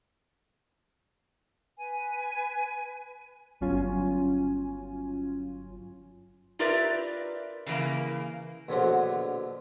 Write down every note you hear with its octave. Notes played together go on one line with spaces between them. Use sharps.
B4 G#5
G1 F#3 C#4 F4 G#5
F4 G4 A#4 B4 D5 E5
C#3 E3 A#3
A#1 B2 D3 F3 F#3 F#4